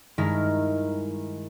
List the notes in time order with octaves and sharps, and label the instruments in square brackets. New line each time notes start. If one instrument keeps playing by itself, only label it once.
[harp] G2 D#3 G#3 E4 A#4 F6